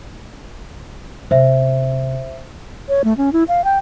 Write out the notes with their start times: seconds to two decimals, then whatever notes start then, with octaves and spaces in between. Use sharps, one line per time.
1.31 C3 C5 E5
2.89 C#5
3.04 A3
3.17 C#4
3.33 E4
3.48 F5
3.64 G5